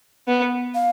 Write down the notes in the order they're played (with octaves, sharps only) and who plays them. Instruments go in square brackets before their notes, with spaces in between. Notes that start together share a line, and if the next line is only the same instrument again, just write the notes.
[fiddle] B3
[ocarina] F5